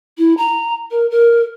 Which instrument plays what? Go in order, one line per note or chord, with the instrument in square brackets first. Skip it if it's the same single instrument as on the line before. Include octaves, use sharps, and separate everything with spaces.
[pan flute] E4
A#5
A#4
A#4